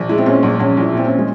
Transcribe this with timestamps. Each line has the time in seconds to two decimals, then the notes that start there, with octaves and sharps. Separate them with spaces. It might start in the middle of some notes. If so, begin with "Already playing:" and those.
Already playing: A#1
0.09 G#3 E4
0.18 C4
0.26 A#2 C#4
0.43 A#1
0.59 A#1 C#4
0.77 A#1 E4
0.93 A#2 C4
1.04 C#4
1.19 G#3